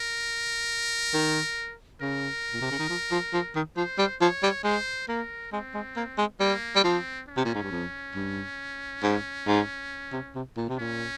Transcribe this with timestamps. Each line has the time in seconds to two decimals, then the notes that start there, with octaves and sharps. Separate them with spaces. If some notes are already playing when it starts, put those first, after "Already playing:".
Already playing: A#4
1.14 D#3
2.01 C#3 A#4
2.54 A#2
2.61 C3
2.71 C#3
2.79 D#3
2.89 F3
3.12 F3
3.33 F3
3.55 D#3
3.76 F3 C5
3.98 G3
4.21 F3 C#5
4.43 G3
4.64 G#3 C5
5.08 A#3 A#4
5.52 G#3 C4
5.74 G#3
5.97 A#3
6.18 G#3
6.40 G3 A#3
6.76 G3
6.84 F3 C4
7.28 C#4
7.37 C3
7.45 A#2
7.54 G#2
7.63 G2
7.71 F2
8.15 G2
9.03 G#2
9.47 G#2
10.13 C3
10.35 C3
10.57 A#2
10.69 C3
10.78 A#2 C#4